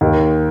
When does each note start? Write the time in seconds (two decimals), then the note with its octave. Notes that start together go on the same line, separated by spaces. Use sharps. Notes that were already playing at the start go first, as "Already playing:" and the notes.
0.01 D#2